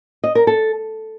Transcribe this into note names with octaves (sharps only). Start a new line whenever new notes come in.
D#5
A#4
A4